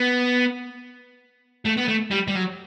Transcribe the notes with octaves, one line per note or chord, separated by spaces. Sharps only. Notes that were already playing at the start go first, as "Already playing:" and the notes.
Already playing: B3
A3
B3
A3
G3
G3
F#3